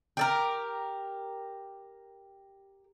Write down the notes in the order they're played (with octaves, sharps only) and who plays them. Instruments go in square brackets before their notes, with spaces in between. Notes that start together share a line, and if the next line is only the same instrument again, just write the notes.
[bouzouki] G4 A4 A#4